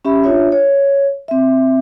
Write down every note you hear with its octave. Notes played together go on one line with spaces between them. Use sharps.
C#4 G4 E5 B5
D4 F4 C#5 E5
C#5
C4 E5